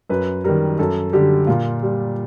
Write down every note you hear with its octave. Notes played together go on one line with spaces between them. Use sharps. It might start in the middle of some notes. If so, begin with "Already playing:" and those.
F#2 B4
D#3 G3 A#4
F#2 A4
D3 G3 G4
A#2 F4
G3